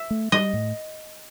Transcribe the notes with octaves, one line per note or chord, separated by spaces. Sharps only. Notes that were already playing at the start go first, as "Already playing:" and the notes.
Already playing: E5
A3
G3 D#5
A2